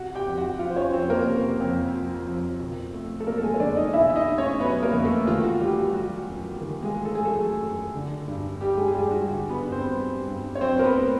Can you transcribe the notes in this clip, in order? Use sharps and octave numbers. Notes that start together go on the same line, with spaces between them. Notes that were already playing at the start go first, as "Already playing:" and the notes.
Already playing: C3 F#4 F#5
G4 G5
F2
F#4 F#5
F3 F4 F5
C5
C#4 C#5
F2 C4 C5
A#3 A#4
C3
F2
F3
F2
B2
A3
A4
F#3 A#3 A#4
A4
G#3 G#4
C#5
E2 D4 D5
D#4 D#5
B2 E4 E5
E5
D#4 D#5
A3
C#4 C#5
F#3 B3 B4
A#3 A#4
E2
A3 A4
D#3 F4
F#4
G3 A3 G4
F#4
F#3 F#4
F#2
D#3
G#3 G#4
A3
A4
G#4
F#3 A3 A4
F#2
D3
G2
G3 G4
G#3 G#4
G#4
G2 G3 G4
F#4
D3 F#4
B3 B4
G2
C4 C5
G3
G2
C#5
F#3 C4 C5
A#4
B3 B4
A2